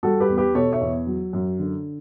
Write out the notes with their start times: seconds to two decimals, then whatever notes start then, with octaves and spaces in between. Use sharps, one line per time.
0.03 G3 F#4 A4
0.20 G4 B4
0.29 E2
0.37 G4 B4
0.55 B2 A4 C#5
0.72 C#5 E5
0.81 E2
1.07 F#3
1.33 F#2
1.59 D3